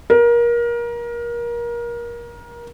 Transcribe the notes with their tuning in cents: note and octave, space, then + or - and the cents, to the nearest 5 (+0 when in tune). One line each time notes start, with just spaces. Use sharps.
A#4 +25